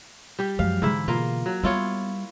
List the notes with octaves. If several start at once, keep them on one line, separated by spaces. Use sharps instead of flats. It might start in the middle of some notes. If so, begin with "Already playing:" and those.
G3 G4
F#2 F3 F#3 G#3 F5
G#2 D3 E3 E4 E5
B2 A#3 F4
F#3
G3 B3 E4 F4 C#5